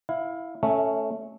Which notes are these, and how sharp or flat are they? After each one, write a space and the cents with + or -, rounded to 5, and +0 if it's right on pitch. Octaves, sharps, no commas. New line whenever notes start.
E4 +0 F5 +20
A3 +0 C#4 +0 E5 -25